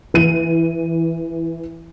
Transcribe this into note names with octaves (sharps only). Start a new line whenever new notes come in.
E3 D#7